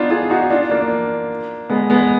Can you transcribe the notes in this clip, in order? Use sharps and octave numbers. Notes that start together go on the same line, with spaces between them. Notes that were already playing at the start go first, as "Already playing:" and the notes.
Already playing: B3 D4 D#4 F4
F4 G#4
D#4 F#4
D4 F4
A#3 D4
G#3 B3
G#3 B3